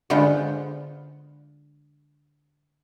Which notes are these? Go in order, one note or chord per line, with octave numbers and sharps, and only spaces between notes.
D3 G#3 B3 F4 C5